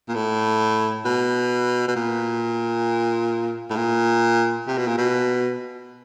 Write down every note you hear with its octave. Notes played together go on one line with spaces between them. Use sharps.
A#2
A2
B2
B2
A#2
A2
A#2
C3
B2
A#2
B2